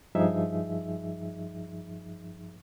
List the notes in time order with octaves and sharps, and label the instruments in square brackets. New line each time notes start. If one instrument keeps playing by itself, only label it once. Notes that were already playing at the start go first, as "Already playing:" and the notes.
[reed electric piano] G2 F3 D#4 G#4 E5